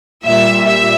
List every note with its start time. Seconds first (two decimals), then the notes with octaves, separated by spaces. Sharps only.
0.25 A#2 G3 E5
0.67 E5